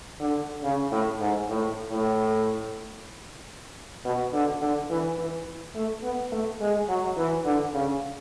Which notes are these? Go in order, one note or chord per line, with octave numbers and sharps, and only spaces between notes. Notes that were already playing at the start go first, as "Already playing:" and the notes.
D3
C#3
A2
G#2
A2
A2
B2
D3
D3
E3
E3
A3
B3
A3
G#3
F#3
E3
D3
C#3